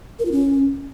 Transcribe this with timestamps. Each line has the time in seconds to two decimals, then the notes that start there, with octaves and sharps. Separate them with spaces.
0.19 A#4
0.25 F4
0.32 C#4